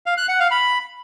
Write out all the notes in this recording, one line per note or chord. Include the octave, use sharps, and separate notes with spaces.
F5
F#6
F#5
F5
B5